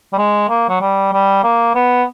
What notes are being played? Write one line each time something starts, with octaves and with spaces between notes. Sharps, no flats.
G3
G#3
A#3
F#3
G3
G3
A#3
B3